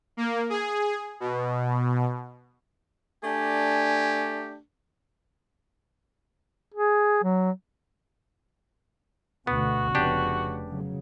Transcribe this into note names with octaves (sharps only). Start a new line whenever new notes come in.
A#3
G#4
B2
A3 D4 G4 G#5
G#4
F#3
D2 B2 B3 F#4
F1 C#3 B3 D4 G4
C#3 F#3